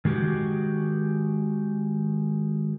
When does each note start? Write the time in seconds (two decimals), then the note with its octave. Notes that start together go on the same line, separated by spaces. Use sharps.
0.05 D#3 G#3 F#4 G4